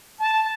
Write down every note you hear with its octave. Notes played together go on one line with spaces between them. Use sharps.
A5